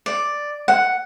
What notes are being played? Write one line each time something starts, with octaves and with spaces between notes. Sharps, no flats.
D5
F#5